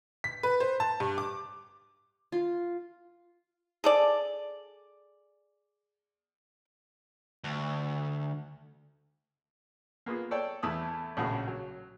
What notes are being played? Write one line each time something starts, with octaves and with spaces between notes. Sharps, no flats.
B6
B4
C5
A5
G2
D6
F4
G#4 A4 D5
D2
A#3 B3 F4 G#4
A4 C#5 D5 G5
E2 A3 E4 A4 B5 D#6
A#1 A2 C#3 F#4 G#4
F#3